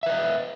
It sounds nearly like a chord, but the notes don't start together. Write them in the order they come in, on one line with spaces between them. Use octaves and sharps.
E5 B4 D#5